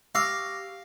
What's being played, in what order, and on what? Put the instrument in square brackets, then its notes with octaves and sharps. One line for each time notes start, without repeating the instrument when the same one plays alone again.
[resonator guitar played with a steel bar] G4 [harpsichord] F5 [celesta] C#6 D6 A#6 [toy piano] E6